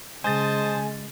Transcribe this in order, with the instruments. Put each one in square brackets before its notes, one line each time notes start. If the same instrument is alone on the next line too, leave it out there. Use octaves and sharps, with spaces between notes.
[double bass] C#3 [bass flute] G#3 [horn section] C5 D#5 A5 [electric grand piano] G#5 A6